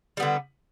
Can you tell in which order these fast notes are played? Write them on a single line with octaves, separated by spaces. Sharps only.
G3 B3 D3